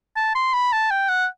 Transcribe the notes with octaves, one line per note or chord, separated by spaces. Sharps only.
A5
C6
B5
A5
G5
F#5